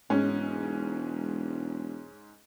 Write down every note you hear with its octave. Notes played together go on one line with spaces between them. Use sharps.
E1 G#2 C#4